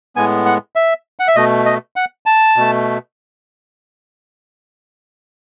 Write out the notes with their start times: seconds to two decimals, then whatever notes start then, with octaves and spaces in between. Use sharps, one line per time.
0.16 A2 G#3 B3 G#5
0.46 F#5
0.76 E5
1.19 F#5
1.28 E5
1.36 B2 A3 D#5
1.66 D#5
1.96 F#5
2.26 A5
2.56 B2 A3